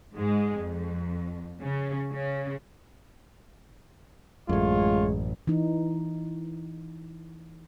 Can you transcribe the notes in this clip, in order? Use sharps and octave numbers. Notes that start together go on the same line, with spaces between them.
G#2 G#3
F2
C#3
C#3
A1 F#2 G#3 A3 F4 C#5
E3 D#4